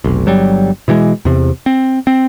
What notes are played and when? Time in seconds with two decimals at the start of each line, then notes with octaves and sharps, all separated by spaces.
0.04 F1 B1
0.26 G1 F#3 G3
0.88 B2 E3 G3 G#3
1.25 E2 C3
1.66 C4
2.07 C4